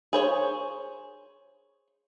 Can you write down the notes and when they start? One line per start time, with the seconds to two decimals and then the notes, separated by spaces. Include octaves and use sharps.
0.13 G#4 C5 C#5